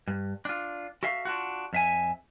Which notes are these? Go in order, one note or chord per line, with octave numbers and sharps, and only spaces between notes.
G2
D4 F4
F#4 A4 E5 F5
D4 F4 F#4
F2 E5 G#5